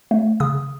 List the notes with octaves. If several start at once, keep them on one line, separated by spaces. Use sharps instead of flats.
A3
C#3 D#6